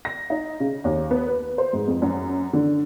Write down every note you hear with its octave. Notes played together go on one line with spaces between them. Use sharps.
A#6
D#4
C#3
D#2
B3
B4
C5
G#2
F2
F#2
D3